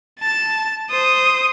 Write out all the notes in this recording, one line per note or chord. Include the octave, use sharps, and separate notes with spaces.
A5 A6
C5 D#6